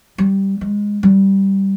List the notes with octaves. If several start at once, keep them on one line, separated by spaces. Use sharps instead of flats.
G3
G#3
G3